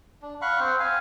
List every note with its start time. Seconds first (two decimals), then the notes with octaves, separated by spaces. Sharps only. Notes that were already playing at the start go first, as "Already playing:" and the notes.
0.22 D4
0.42 F5 F#5 B5 C#6
0.60 C4 C5
0.80 F5 G#5